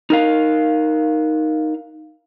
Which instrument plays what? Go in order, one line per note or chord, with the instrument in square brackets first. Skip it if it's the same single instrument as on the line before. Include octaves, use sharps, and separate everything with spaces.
[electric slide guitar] D#4 A#4 F5